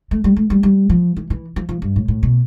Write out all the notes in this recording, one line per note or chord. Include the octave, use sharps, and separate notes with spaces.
A3
G3
A3
G3
G3
F3
E3
E3
F3
F3
G2
A2
A2
B2